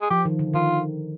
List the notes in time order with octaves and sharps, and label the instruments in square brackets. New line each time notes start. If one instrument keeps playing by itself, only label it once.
[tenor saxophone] G#4
[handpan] F3 [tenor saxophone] G4
[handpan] D#3
D3
[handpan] D#3 [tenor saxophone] F4